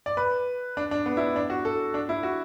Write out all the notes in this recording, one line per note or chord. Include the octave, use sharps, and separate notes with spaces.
D5
B4
D4
D4
B3
E4
D4
D4
F#4
A4
D4
E4
F#4